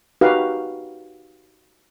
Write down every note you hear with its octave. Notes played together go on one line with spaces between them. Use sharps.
D#4 F#4 G4 A#4 B4 F5